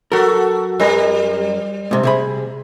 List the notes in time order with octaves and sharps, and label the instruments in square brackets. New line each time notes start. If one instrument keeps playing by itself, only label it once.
[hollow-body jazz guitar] F#3 A#4 [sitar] F#4 A4
[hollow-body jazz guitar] F#2 A#4 B4 [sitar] G3
[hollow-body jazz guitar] G#2 C3
C3 G#4 B5